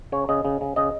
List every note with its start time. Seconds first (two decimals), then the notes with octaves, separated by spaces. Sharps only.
0.12 C#3 C#5
0.29 C#3 D#5
0.45 C#3
0.61 C#3
0.76 C#3 D#5